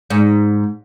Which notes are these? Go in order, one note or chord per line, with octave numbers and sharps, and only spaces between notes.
G#2